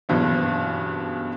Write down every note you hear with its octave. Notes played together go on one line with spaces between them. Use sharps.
F#1 G2 B2 E3